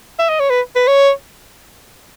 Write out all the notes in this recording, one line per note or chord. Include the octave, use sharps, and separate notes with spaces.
E5
D#5
C#5
B4
B4
C#5